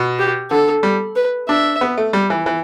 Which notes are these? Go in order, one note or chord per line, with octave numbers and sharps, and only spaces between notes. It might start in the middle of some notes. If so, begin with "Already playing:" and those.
Already playing: B2
G4
D3 A4
G3
B4
D4 E5
B3
A3
G3
E3
E3